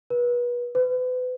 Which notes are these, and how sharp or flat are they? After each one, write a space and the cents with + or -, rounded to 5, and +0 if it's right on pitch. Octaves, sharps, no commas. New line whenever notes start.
B4 -30
B4 +35